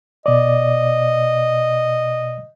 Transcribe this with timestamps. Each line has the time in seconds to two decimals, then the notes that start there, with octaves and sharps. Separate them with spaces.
0.26 B2 D5 D#5